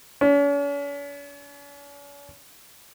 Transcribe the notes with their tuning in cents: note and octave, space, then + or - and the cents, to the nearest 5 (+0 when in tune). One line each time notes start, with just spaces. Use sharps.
C#4 +45